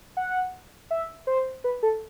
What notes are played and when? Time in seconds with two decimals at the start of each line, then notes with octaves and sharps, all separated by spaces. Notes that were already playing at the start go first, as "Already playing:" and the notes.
0.17 F#5
0.91 E5
1.27 C5
1.64 B4
1.83 A4